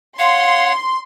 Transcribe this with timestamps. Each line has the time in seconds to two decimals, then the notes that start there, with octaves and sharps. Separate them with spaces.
0.19 C#5 F5 F#5 C6